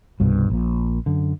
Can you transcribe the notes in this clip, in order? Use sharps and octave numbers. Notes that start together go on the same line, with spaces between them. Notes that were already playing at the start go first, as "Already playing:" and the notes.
C2 G2 B2
A#1 A#2
F#2 D3